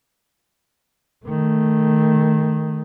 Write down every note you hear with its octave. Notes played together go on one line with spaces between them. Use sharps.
D#3 A3